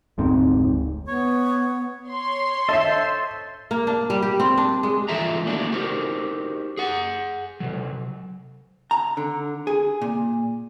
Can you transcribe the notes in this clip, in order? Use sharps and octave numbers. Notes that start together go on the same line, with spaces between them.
F1 D2 G#2 C4
B3 C#5
C#5 C6
A4 C5 D#5 E5
A#3
D4
G3
G4
C4
D4
G#3
E3 G#3 F4 A4 E5 A#5
A3 A#3 D4 D#4 F#4 G4
D#4 F#4 G4 A#4 C5
G#4 F#5
C3 F#3
A#5
D3
G#4
A#2